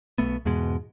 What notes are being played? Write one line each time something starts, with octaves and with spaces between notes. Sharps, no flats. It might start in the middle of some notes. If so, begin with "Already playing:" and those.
B1 A3 B3
E2 G#2 B2 G#3